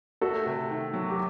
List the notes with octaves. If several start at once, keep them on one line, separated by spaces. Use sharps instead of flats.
A3 F#4 A4
C3
D#3
F#3
G4